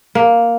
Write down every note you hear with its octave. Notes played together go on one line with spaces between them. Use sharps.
A#3